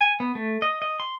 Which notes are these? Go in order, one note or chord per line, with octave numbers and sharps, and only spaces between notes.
G#5
B3
A3
D#5
D#5
C6